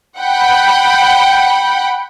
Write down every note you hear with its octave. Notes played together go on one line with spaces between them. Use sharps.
F#5 G5 B5